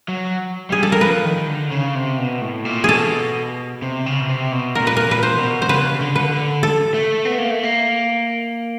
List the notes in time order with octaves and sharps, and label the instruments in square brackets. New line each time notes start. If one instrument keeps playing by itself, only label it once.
[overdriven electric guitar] F#3
[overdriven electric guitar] G3 [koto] G#4
[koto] A4
A#4
[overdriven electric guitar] F3 [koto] B4
[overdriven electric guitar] D#3
D3
C#3
C3
B2
A2
A#2
[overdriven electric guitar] B2 [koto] G#4 A4
[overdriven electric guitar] C3
C#3
B2
C3
B2
[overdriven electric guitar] A#2 [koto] A#4
[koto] B4
A#4
[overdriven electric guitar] A#2 [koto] B4
[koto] C5
[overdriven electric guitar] B2
[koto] C5
[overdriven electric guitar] C#3 [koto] B4
[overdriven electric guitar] D3
[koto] B4
[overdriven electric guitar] D3
[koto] A4
[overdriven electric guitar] A3
B3
A#3
A3
A#3